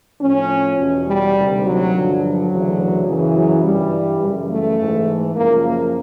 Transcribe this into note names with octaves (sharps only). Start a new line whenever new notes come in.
A2 F3 C#4
E2 B2
G3
D2 C3 D#3
F#3
G2 D3 F3
F#3
D2 C#3 E3
F#2 C#3 E3
F#3
G2 E3 G3
F#2 C#3 E3
A3
G#2 E3
F#2 C#3 F3 A#3
A#3